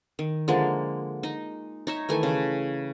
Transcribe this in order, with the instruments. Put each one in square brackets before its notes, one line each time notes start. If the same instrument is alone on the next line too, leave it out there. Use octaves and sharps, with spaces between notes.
[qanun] D#3
D3 F3 G#3 A#3
D#4
D#4 C#5 E5
D#3 E3 A3 G#5
C#3